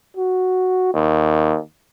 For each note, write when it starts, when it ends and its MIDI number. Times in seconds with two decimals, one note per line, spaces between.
0.17 0.90 66
0.94 1.58 39